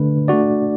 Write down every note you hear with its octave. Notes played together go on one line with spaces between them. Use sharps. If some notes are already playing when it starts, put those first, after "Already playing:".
Already playing: D3 A3 D4 B4
A3 D4 F#4 D5